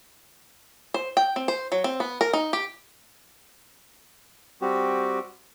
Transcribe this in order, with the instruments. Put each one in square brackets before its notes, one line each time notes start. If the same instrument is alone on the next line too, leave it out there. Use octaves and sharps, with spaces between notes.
[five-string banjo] C5
G5
C4
C5
F#3
C4
B3
A#4
D#4
G4
[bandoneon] G3 C4 F#4 G4